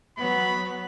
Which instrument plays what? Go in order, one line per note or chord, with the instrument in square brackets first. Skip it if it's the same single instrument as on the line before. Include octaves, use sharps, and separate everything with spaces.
[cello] F#3 B3 [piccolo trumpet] B5